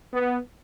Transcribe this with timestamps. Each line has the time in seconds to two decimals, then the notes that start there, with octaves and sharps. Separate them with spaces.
0.12 B3